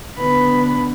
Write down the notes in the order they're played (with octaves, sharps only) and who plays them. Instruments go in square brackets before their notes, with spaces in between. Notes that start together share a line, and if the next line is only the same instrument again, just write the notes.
[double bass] D3 B3 [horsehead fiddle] B4